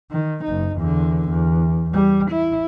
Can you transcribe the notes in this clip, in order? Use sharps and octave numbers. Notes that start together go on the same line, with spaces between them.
D#3
F#1 D#4
E2 D3
E2
G3
E4